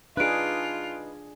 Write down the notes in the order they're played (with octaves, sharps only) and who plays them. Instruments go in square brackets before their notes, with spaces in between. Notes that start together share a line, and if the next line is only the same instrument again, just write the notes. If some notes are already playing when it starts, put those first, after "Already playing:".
[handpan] D4 G#4 [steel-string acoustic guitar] D#4 B4 [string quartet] F4 [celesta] F#6 D7